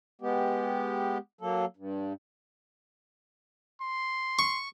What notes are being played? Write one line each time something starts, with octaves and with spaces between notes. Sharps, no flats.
G#3 B3 G4
F#3 A#3 A4
G2
C6
C#6